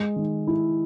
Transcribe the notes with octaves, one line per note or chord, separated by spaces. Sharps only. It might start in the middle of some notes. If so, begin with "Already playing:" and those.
Already playing: G#3
D#3
E4